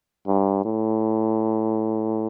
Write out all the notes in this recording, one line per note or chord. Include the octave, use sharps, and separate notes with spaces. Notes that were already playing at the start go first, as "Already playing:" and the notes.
G2
A2